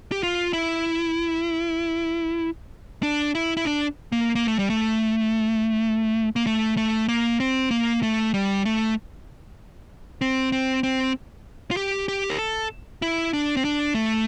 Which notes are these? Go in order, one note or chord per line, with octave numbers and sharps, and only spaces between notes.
G4
F4
E4
D4
E4
E4
D4
A#3
A#3
A3
G3
A3
A#3
A3
A3
A#3
C4
A#3
A3
G3
A3
C4
C4
C4
F4
G4
G4
A#4
A4
E4
D4
C4
D4
A3